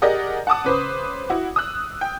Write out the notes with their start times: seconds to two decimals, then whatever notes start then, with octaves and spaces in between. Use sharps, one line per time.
0.02 G4 G#4 A#4 D5 D#5 F#5
0.47 F#5 A5 D6 D#6
0.64 C#3 B4 C5
1.30 E4 F#4
1.56 D#6 E6 F#6
2.01 G5